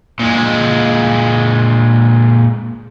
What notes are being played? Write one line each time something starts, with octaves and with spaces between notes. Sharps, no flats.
A#2 G#3